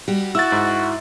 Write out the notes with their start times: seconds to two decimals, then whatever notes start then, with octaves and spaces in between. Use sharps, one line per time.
0.08 G3 F#4 G4
0.35 E4 F#4 E6 A6
0.52 G#2